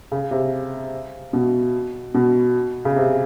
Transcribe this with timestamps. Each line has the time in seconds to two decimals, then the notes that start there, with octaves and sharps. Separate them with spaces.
0.12 C#3
0.31 C3
1.33 B2
2.15 B2
2.85 C#3
2.96 C3